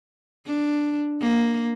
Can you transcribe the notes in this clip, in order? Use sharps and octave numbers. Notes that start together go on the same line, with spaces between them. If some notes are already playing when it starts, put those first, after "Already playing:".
D4
A#3